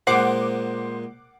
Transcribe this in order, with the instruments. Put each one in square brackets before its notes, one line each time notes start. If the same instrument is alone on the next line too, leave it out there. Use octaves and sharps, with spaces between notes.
[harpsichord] A#2 G#3 [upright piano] C5 C7 [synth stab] F#5 D6